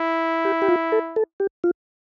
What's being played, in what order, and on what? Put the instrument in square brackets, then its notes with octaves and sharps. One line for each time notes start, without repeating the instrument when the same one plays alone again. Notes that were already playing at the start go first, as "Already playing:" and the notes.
Already playing: [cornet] E4
[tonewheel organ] G4
G4
F4
A4
A4
G4
F4